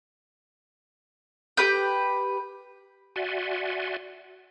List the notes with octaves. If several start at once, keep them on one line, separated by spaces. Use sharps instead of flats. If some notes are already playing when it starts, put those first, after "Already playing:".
G4 B4 G6
F#4 D5 E5 F#5 G#5 C6